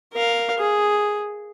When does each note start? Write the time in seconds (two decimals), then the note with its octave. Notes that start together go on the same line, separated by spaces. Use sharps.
0.13 A#4 F5
0.58 G#4